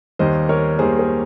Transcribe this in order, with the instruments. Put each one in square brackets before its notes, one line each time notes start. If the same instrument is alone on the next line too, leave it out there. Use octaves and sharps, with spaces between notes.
[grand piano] D#2 D#3 G3 A#3 C5 D#5
A#4 C#5
D#2 D#3 G3 A#3 G#4 C5
G#4 C5